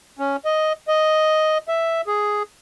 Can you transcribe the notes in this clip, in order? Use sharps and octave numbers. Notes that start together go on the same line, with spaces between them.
C#4
D#5
D#5
E5
G#4